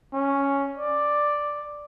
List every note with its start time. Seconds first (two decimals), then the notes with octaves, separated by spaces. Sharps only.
0.13 C#4
0.77 D5